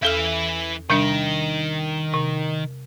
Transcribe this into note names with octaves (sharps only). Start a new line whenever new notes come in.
E2 E3 A4 E5 F6
C3 D#3 G3 D4
C3